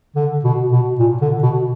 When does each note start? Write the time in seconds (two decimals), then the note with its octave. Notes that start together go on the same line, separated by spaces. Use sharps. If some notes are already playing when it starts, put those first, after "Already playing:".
0.15 D3
0.44 B2
0.72 B2
0.99 A#2
1.21 D3
1.42 B2